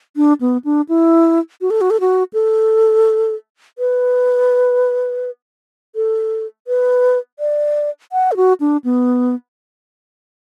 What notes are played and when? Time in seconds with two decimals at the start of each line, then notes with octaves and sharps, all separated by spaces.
0.16 D4
0.41 B3
0.65 D4
0.89 E4
1.61 F#4
1.70 A4
1.81 F#4
1.90 A4
2.00 F#4
2.33 A4
3.79 B4
5.95 A4
6.68 B4
7.39 D5
8.12 F#5
8.32 A4
8.37 F#4
8.60 D4
8.84 B3